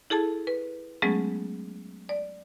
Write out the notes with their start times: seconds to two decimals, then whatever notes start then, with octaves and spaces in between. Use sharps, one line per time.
0.10 E4 G#4 A4 A5
0.47 B4
1.02 F#3 G#3 A3 B3 C#4 G#4
2.09 D5